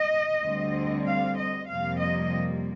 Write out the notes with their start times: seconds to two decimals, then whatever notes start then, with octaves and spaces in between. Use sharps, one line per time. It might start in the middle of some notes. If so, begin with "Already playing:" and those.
Already playing: D#5
0.43 D2 D3 G3 C4
1.07 F5
1.38 D#5
1.69 F2 C3 G3 A#3 F5
2.01 D#5